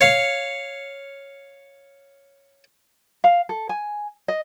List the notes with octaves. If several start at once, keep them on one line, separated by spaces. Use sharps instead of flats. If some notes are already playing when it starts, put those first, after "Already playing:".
C#5 F5
F5
A4
G#5
D#5